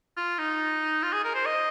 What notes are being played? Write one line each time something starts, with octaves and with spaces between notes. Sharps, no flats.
F4
D#4
F4
G#4
A#4
C5
D#5